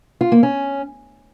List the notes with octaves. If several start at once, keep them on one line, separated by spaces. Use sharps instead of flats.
F4
A#3
C#4